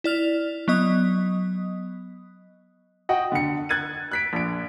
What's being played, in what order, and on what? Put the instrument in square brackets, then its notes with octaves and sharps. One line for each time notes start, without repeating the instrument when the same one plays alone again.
[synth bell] E4 D5 F6 F7
F#3 B3 D#5 D#6
[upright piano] F#4 D#5 F#5 G5
D3 C#7
F#6 G#6 A6 D#7
F#6 B6 D7
A#1 D7